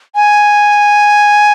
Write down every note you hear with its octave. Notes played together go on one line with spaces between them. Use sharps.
G#5